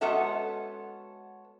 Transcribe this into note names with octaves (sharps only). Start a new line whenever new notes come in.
G#3 B3 C#4 F#4 A4 E5